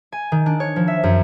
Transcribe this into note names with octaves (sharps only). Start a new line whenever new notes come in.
G#5
D#3
D4
C#5
F3
E5
F#2